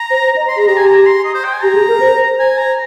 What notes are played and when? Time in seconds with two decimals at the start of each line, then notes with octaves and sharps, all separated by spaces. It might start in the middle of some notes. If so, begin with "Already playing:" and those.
Already playing: A#5
0.10 C5
0.23 C5
0.36 D#5
0.48 C6
0.57 G#4 A#5
0.67 G4 A#5
0.77 G#5
0.86 A#5
1.06 C6
1.24 D#5
1.34 C5
1.44 G5
1.53 G#5
1.62 G4 A#5
1.75 G#4
1.88 A#4
2.00 C5
2.38 C5 G#5
2.58 A#5